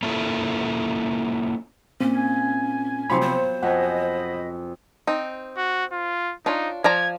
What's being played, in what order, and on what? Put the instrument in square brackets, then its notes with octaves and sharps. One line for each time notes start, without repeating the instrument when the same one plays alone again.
[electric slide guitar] A#3 C#4 E4 F4 A4
[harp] A#2 [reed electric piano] C4 [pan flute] C#4
[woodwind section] G#5
[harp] C3 F3 F#3 [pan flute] D#4 [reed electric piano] B5 C6
[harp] B3 [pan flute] C5
[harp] F2 G#5 [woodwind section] D#5 B5 [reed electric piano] F#5
[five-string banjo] C4 D#4
[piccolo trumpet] F#4
F4
[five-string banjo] D4 F4 C#5 [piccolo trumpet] D#4
[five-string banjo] F3 D5 A#5 [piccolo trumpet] G#6